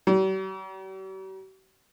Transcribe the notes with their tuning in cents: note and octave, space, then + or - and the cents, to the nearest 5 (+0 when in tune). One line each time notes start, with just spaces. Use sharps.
G3 -45